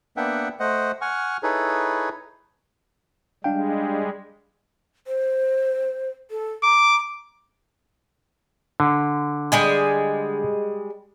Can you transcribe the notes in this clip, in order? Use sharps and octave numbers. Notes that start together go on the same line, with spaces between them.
A#3 B3 D4 E5 F#5 G5
A3 C5 D#5 F#5
F#5 G#5 C#6 F6
D#4 E4 G#4 A4 B4 C#5
G3 G#3 D4 F5 G5
C5
A4
A#5 D6
D3
G3 G#3 G#5